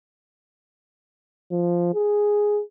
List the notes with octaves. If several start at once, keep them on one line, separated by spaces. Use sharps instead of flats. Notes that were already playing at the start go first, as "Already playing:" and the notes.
F3
G#4